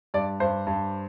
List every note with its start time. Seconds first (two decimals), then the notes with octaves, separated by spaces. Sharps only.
0.14 G2 D5
0.40 G2 C5
0.67 G2